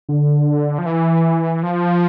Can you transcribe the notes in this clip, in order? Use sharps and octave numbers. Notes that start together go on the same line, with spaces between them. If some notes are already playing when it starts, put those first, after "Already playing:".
D3
F3
E3
F3